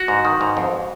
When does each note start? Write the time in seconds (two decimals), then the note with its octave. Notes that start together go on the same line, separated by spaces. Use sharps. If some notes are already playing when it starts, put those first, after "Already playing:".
Already playing: F#4
0.08 G#2
0.25 D#3
0.41 G#2
0.57 F2